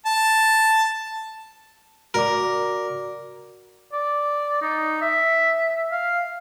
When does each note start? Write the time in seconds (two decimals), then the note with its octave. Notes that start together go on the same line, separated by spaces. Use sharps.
0.06 A5
2.14 F#4 A#4 D5 D6
3.93 D5
4.62 D#4
5.01 E5
5.91 F5